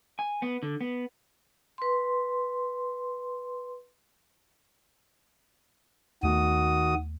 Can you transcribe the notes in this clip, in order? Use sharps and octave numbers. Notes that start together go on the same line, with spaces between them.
G#5
B3
D3
B3
B4 C6
D#2 D#3 A3 B3 F#4 D#6